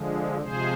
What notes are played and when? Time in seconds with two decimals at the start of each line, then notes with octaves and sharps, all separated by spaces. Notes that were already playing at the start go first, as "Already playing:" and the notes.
Already playing: D3 F3 G#3
0.41 C3 F3 G#3 G#4 C5